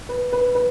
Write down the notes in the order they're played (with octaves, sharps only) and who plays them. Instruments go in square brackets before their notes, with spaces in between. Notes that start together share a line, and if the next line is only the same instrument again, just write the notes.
[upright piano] B4
B4
B4